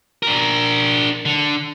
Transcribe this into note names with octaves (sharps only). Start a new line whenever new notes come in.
D4 A#4
D3